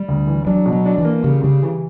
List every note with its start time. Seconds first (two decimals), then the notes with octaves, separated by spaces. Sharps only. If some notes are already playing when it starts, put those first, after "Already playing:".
Already playing: G3
0.08 D2
0.27 E3
0.46 F#3 D4
0.66 B2
0.72 F#3
0.86 D4
0.98 E3
1.05 A#3
1.24 C#3 G3
1.43 C#3 G3
1.63 E3